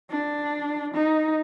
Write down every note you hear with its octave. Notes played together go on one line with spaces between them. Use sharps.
D4
D#4